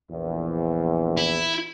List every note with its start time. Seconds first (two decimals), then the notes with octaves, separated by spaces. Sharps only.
0.11 A#1 E2
1.17 E4